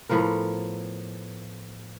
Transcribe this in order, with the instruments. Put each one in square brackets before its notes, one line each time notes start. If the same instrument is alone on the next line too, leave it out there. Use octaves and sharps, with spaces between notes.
[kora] A2 F3 B3 A#4